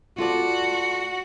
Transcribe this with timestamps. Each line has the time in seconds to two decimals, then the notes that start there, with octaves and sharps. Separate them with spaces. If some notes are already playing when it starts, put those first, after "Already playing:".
0.18 F4 F#4 A4 D5